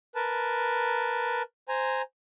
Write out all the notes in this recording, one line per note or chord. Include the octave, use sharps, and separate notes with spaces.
A#4 B4 A5
C5 G#5 A#5